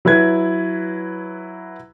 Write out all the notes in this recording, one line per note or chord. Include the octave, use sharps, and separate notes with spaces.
F#3 E4 B4 G#6